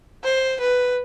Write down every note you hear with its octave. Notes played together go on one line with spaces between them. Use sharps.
C5
B4